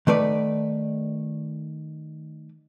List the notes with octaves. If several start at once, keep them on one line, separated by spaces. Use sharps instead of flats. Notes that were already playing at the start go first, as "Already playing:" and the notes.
D#3 A3 B4 D5